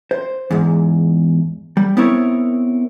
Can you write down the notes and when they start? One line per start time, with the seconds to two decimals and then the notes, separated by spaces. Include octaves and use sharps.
0.11 C5
0.51 E2 G#2
1.77 G3
1.97 B3 C4 E4 A#4 C#5